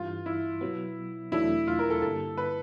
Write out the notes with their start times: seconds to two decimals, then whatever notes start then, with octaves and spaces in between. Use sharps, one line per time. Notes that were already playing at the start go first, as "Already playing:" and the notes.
Already playing: G2 E3 G3 F4
0.26 E4
0.61 B2 F#3 B3
1.32 E2 B2 F#3 A3 D4 E4
1.67 F4
1.79 A#4
1.90 A4
2.02 G2 D3 G3 A#3 A4
2.37 B4